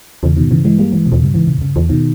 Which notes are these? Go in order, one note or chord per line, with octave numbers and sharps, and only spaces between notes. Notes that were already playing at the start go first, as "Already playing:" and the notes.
E2 C#3
B2 D#3
G2
C#3 E3
E3 G#3
G3 A#3
E3 G#3
B2
E2
G2 C#3
G#2 C#3 E3
A#2 C#3
E2
G2 C#3
E2
B2 D#3